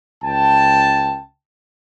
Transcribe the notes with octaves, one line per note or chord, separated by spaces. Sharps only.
C#2 G5 A5